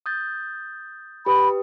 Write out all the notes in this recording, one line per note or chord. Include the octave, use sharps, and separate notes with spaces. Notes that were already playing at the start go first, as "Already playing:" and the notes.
D#6 G6 A6
G4 B4 B5 D#6